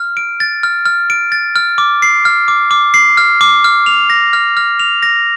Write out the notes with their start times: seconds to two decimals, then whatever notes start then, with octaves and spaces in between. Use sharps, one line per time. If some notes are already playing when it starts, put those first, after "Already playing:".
Already playing: F6
0.17 D7
0.40 A6
0.63 F6
0.85 F6
1.10 D7
1.32 A6
1.56 F6
1.78 D6
2.02 C7
2.25 F6
2.48 D6
2.71 D6
2.94 C7
3.17 F6
3.41 D6
3.64 F6
3.86 F7
4.10 A#6
4.33 F6
4.57 F6
4.79 F7
5.03 A#6